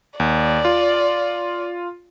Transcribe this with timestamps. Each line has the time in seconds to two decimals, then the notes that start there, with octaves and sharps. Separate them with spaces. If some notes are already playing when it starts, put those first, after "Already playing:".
0.20 D#2 D5
0.65 F4